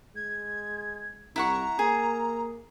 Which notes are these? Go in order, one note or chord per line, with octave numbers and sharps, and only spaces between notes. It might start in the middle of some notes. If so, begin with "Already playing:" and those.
G#3 G#6
C2 E4 F#5 A#5 C#6
A#3 G#4